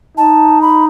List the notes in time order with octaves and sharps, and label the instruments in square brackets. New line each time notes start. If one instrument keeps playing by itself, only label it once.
[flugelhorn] D#4 [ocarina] A5
[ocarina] B5